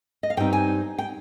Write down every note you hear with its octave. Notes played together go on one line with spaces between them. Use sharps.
D#5
F5
G2 G3 C4 D#4 G5
G#5
G5